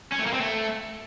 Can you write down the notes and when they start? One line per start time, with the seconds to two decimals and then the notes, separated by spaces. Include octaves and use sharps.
0.12 C#4
0.19 A3
0.26 A#3
0.33 C4
0.41 A3